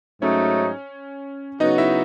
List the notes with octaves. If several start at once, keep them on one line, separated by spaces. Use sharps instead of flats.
G#2 F#3 A3 C#4 D#4 C#5
C#3 F#3 B3 D#4 F#4 D#5
E4 E5